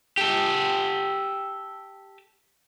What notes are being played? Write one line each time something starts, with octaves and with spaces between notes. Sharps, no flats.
G4 A4